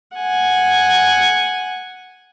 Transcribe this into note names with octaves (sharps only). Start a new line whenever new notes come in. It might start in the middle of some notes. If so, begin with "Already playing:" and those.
F#5 G#5